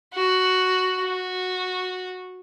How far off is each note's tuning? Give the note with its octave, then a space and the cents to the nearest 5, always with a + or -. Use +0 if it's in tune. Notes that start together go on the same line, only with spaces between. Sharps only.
F#4 +5
F#4 -10